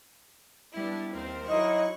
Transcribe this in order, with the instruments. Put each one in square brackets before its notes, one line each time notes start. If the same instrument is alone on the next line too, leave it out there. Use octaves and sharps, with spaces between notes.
[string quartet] G3 E4 [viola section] B3 D4
[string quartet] D#2 C4 [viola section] A#4 C5
[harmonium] F#3 D#4 E4 [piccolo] D#5 [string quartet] C#6 F#6